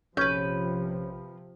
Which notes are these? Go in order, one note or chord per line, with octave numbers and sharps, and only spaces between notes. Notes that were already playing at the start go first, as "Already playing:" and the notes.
A#1 C3 F3 C#4 B4 G6